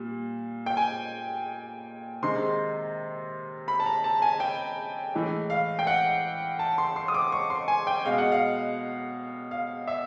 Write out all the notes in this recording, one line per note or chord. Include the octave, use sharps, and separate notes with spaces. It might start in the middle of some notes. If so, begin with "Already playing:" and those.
Already playing: A#2 G3
G5
G#5
C3 D#3 G#3 C6
B5
A5
A#5
A5
G#5
G5
A2 E3 G#3
F5
G5
F#5
A5
C6
C6
D#6
D6
C#6
C6
G#5
G5
B2 G#3 F5
F#5
F5
F5
E5